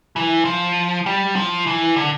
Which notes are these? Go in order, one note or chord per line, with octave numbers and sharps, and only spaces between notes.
E3
F3
G3
F3
E3
D3